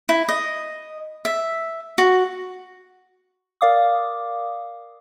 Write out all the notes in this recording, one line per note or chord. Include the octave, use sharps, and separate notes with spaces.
E4
D#5
E5
F#4
A#4 D5 F5 D6 D#6